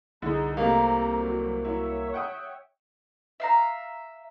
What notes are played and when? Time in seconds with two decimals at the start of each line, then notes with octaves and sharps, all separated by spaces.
0.22 C2 D3 D#4 E4 G#4
0.57 C3 G3 A3 A#3 A#5
1.20 F#3 F#4
1.64 F#3 E4 C#5 E5
2.14 F#5 G5 D#6
3.40 E5 F5 A#5